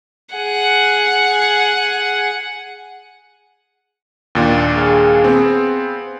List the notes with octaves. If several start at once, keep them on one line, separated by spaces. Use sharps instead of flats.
G#4 F#5
D#2 A#2 D4
G#4 F5
B3 C4